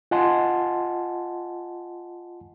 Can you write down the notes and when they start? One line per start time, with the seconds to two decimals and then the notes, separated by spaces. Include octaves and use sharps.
0.11 F4 D#5 F#5 G#5 A5 C6